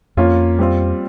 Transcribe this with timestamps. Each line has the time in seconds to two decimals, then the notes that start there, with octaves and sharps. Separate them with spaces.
0.17 F2 F3 A#3 C#4 F4
0.59 G3 C4 F4